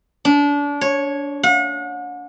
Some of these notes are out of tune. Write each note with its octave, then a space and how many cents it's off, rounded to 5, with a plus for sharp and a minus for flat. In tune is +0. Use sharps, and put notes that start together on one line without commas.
D4 -30
C#5 -5
F#5 -40